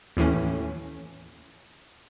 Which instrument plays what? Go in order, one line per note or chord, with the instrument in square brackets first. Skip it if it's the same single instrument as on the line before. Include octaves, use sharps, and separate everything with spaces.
[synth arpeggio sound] D#2 A2 E3 A3 C#4